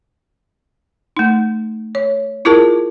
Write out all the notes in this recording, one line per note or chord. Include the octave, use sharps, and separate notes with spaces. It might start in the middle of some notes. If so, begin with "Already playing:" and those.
A3 D#4
C#5
E4 F4 G#4 A#4 A5